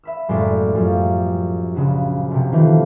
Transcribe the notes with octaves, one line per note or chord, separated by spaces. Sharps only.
E5 B5 E6
F#1 F#2 A2 G#3 D5
F#2 F3 G3
A#1 C#3 F#4
B1 C3
D#3 E3 A3 F4